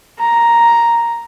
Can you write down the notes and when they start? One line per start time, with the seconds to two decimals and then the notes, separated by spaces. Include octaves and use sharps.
0.19 A#5